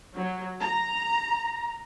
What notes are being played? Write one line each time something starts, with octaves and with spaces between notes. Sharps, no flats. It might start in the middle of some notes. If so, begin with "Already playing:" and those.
F#3
A#5